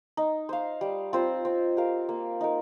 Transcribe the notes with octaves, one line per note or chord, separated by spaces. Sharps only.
D#4
C5 F5
G3
C4 F4 C5
C4
G4 A#4 F5
A#3
D#4 A#4